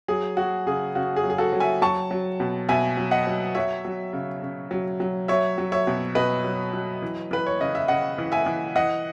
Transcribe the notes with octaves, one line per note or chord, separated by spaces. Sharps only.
F#3 G#4
F#3 F#4
C#3 G#4
C#3 F#4
G#4
F#3
G#4
F#4 A4
F#3
E5 G#5
F#3 A5 C#6
F#3
B2
B2 E5 G#5
F#3
D#5 F#5
F#3
F#3 C#5 E5
F#3
C#3
C#3
F#3
F#3
F#3 C#5 E5
F#3
C#5 E5
B2
B2 B4 D#5
F#3
F#3
E3
E3 B4
C#5
C#3 D#5
E5
C#3 D#5 F#5
E3
E5 G#5
E3
E3 D#5 F#5